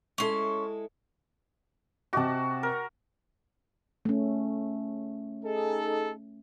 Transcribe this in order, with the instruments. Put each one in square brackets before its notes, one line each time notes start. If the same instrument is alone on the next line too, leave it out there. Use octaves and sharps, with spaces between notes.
[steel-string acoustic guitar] G#3 E4 A4 [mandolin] C#4 C6
[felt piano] C3 D#5 D6 [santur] F#4 A5
[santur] A#4
[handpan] A3 C#4
[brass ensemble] D#4 G#4 A4